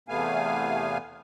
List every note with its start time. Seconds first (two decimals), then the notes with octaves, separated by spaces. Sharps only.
0.09 E2 C3 A3 B3 F5 G#5